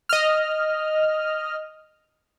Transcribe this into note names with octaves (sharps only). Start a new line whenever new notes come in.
D#5 F6